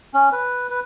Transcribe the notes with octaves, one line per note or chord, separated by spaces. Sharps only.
C#4
B4
B4